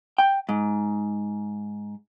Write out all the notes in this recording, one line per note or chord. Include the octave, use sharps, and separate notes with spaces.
G5
G#2